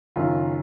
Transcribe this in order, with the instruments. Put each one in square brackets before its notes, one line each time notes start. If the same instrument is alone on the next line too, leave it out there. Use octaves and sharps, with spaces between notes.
[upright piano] F#1 F#2 D#3 F4